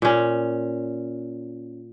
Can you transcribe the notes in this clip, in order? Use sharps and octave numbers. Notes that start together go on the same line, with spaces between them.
A#2 C#4